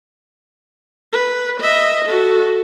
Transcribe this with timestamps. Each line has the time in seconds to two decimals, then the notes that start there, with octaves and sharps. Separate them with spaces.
1.13 B4
1.61 D#5 E5
2.05 F#4 A4